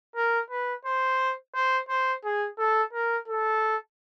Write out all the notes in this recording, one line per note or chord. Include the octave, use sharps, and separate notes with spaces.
A#4
B4
C5
C5
C5
G#4
A4
A#4
A4